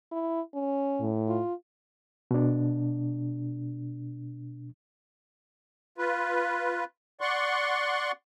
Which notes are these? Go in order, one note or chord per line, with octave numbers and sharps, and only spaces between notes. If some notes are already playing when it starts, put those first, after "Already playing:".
E4
C#4
A2
F4
B2 D4
F4 B4
D5 F#5 C6 C#6